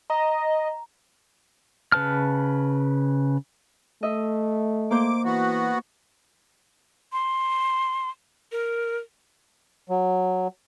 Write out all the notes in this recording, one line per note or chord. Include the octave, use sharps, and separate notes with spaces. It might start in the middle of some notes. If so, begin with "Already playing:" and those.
D#5 A#5
C#3 B4 A5 F6
A3 D#5 E5
A#3 C5 D6
E3 B3 F#4
C6
A#4
F#3